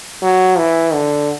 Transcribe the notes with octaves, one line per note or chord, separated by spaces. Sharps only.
F#3
E3
D3